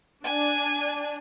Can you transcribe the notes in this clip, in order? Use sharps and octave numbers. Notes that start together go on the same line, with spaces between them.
D4 G#5